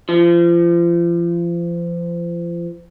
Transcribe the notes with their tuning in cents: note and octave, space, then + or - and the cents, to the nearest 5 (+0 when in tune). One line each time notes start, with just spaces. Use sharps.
F3 -35